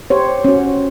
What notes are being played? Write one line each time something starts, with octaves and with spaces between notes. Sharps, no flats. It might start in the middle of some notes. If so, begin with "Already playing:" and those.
G4 C5 C#5
C#4 F#4